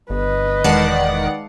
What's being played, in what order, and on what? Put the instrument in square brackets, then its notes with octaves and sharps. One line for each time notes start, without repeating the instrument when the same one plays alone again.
[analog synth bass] G1 [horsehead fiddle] B4 D#5
[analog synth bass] E1 [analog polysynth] D#3 D5 F#5 [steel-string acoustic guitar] G#3 F5 A5